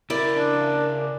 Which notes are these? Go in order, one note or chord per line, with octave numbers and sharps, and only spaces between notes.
C#3 E4 A#4 D5 E5
D4